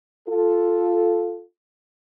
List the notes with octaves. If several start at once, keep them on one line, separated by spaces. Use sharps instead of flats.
F4 A4